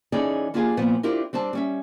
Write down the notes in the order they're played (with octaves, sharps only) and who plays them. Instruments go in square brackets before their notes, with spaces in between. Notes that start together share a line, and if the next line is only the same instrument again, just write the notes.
[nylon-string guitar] E3 C#4 D#4 G#4 A4 D5
A#3 D4 F4 G4 G#4 G#5
A#2 F3 B3
C4 D4 E4 F4 G4 A#4
G3 C4 D4 A5
G3 C#4 E5